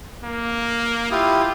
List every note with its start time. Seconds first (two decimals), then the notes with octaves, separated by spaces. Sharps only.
0.23 A#3
1.11 E4 F4 G4 D#6